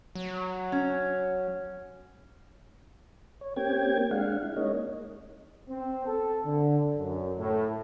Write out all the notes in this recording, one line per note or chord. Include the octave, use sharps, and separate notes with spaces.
F#3
C#4
C#5
A#3 C4 C#4 G4 G5 G#6
G#3 D4 F5 F#5
E4
G#3 A#3 C#4 D#4 C#5 D#5
C4
A4
D3
F#2
A2